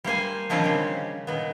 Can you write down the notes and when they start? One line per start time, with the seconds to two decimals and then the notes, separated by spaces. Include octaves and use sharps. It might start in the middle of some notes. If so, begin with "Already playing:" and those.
0.04 G3 A#3 C5 G#5
0.50 D3 D#3 F3 G3 C4 C#4
0.64 C#3 G3
1.27 A#2 D#3 B3